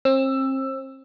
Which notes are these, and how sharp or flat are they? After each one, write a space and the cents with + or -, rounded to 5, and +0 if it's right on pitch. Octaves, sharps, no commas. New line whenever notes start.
C4 +35 E6 +10